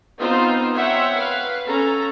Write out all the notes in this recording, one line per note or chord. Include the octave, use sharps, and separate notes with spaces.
B3 C4 D#4 F4 C5
C5 C#5 E5 F#5 G5
B4 F5
C#4 A4 A#5